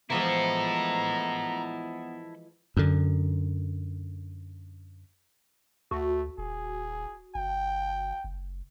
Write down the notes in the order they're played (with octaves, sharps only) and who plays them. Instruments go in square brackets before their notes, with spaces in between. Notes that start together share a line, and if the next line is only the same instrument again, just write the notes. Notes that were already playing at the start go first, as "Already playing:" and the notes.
[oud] E3 F3 G#3 [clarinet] B3 [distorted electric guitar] E4 A4 [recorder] A#5
[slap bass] F#2 D3
[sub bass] D2 [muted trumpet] A3 [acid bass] F#4
[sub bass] D#1 [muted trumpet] G#4
[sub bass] G1 [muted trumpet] G5
[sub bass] F#1